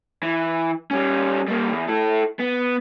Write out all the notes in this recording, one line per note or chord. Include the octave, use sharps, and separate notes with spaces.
E3
G3 C#4
G3 A#3
E2
E4 A4
B3